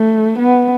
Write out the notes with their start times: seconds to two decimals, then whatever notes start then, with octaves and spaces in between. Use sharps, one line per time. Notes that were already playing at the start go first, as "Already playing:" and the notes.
Already playing: A3
0.38 B3